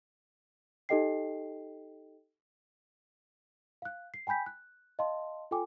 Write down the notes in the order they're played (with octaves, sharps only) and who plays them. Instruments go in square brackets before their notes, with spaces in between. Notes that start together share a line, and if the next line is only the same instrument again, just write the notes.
[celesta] D#4 G4 A4 D#5 G5 C7
F5 F#6
C7
G5 G#5 B5 G6 B6
F#6
D#5 F5 A5 C6
F4 A4 G5 G#5 D6